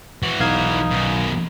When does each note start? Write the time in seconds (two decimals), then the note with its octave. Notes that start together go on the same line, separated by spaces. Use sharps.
0.23 E3 F#4
0.40 B1 D#4 F5 G#6
0.91 F#2 B2